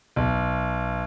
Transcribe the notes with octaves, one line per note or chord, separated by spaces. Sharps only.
B1